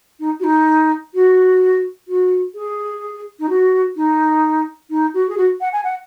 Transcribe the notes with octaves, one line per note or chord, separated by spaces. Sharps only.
D#4
F#4
D#4
F#4
F#4
G#4
D#4
F#4
D#4
D#4
F#4
G#4
F#4
F#5
G#5
F#5